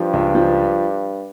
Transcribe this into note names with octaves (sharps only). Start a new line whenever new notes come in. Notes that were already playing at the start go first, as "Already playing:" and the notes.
Already playing: G2 F3
C#2
F3